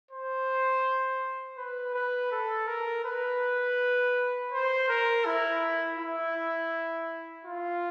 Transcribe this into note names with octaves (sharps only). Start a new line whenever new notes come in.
C5
B4
B4
A4
A#4
B4
C5
A#4
E4
E4
F4